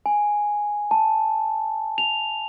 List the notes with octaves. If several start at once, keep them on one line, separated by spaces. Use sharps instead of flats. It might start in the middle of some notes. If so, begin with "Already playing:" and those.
G#5
A5
F7